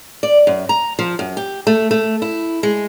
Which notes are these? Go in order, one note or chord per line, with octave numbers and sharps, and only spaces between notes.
D5
F#2
A#5
F3
F#2
G4
A3
A3
E4
G#3